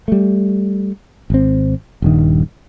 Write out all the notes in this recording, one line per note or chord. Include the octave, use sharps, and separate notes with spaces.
G3 A3
G#1 C4
D#1 G2 D#3